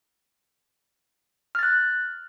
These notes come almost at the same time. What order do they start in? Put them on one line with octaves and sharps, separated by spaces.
F6 A6 F#6